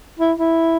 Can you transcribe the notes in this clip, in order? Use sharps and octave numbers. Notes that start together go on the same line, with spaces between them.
E4
E4